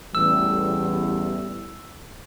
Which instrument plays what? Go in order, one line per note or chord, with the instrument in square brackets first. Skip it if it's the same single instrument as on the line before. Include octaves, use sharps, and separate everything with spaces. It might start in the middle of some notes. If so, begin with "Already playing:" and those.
[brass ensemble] A1 E2 [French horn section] G3 A3 [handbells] E6